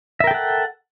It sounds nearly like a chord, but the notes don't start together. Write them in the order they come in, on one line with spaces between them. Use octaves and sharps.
E5 A#4 G5 A4 F#5